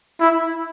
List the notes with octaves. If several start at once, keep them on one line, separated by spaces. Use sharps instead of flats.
E4